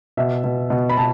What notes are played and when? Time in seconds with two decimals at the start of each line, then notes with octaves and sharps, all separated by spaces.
0.17 B2 E5
0.44 B2
0.70 B2
0.89 B5
0.97 B2 A5